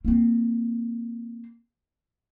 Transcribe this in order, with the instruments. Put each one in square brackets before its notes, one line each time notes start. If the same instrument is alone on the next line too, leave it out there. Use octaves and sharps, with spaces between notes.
[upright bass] A#3 C4